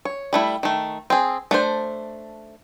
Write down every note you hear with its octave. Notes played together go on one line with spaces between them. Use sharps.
C#5
G3 A3 E4
D#3 A3
C4 G#4
A3 D4 C5